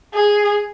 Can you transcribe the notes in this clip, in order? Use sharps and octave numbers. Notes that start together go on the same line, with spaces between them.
G#4